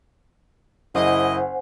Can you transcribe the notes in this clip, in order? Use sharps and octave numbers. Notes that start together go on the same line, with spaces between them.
F#1 E4 C5 D#5 F#5 G#5